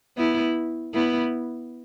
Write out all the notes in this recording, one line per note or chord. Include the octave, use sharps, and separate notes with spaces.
B3 E4
B3 E4